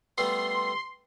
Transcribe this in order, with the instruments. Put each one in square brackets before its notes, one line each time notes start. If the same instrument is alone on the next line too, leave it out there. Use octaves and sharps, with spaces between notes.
[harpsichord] G3 A3 B3 [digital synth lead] C6